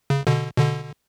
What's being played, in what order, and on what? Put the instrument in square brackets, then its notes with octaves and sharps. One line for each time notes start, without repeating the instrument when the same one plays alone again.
[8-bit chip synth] C#3
B2 D3
B2 D3